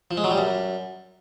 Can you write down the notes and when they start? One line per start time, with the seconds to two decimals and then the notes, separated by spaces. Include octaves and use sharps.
0.11 F3
0.17 G#3
0.24 F#3
0.31 G3
0.38 F#2